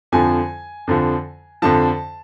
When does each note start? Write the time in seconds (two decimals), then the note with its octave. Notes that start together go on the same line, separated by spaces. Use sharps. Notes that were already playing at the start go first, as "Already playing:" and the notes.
0.12 F2 D3 F3 G#5
0.87 F2 D3 F3
1.62 F2 D3 F3 A5